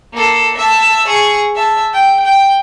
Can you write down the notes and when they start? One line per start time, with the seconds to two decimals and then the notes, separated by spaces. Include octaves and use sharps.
0.13 A#3 A4
0.57 E5 A5
1.07 G#4 C#6
1.56 E5 A5
1.93 G5
2.25 G5